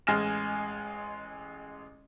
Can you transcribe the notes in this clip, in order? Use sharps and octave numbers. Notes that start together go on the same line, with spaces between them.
A1 G#3 G#5 F6 A#6 E7